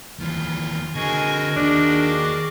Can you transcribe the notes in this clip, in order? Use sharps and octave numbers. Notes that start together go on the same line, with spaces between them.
D#2 E3 F4 F6
D3 F#4 G#4 A#4 D#5 G#5
D#2 D4 G#4 D5